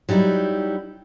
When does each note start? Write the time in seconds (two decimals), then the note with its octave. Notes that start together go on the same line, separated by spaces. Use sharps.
0.09 F#3 G3 D#4 E4